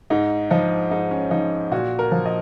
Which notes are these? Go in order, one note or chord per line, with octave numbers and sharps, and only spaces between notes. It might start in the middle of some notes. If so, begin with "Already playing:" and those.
G#2 D#4
F3 D#4
G#2 D#4
C#4
F3 D#4
A#2 F#4
A#4
F3
D#5